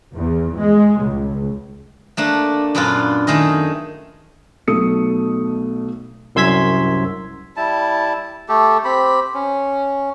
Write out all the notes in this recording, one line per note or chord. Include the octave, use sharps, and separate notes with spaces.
E2
G#3
C#2
A3 A#3 D4
F#2 A#2 B3 D4 F4
D#3 A3 G#4 D#5
B1 B2 A3 D#6 C#7
C2 F#2 C6 E6 G#6 B6
G3 E4 A5
A3 G4 A4
C4 G4 B5
C#4